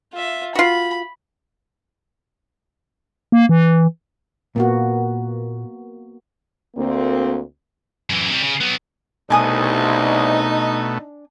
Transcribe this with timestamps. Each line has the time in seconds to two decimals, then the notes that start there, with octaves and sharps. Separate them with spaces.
0.13 F4 E5
0.55 F4 F#4 B5
3.32 A#3
3.49 E3
4.56 A#2 A#3 B3 F#4
6.77 D2 A#3 C4
8.10 F#2 E3
8.30 C3 G3
8.43 C#3
8.61 F#3 B3
9.30 C2 B2 A3 D4 D#4 G#5 D#6